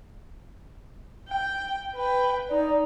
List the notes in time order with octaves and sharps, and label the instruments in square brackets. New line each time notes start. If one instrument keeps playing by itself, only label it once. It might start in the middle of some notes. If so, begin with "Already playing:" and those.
[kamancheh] G5
B4 G5
[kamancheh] D#4 [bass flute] D5